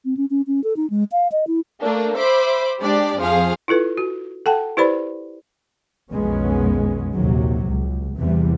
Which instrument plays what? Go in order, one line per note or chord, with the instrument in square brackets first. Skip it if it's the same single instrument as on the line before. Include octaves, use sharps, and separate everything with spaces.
[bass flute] C4
C#4
C#4
C#4
A4
D#4
G#3
F5
D#5
E4
[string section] A3 A#3 D4
C5 E5 B5 D6
G#3 D4 G4 D5
F2 F3 G#4 F5
[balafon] E4 F4 A4 B4
F#4
A4 F#5 G5 A5
E4 G4 B4 C5 D5 B5
[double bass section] B1 F2 D#3 G#3 B3 C#4
A#1 D#2 C3 F#3
C#2
E2 C3 E3 G3